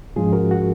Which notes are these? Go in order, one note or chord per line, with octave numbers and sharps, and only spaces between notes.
G#2 F3 G#3 C#4 F4 G#4
F#4 A#4
F#4